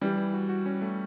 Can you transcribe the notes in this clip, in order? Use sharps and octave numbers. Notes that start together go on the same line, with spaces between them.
E3 G3
E3
F#4
F#4
C#4
A3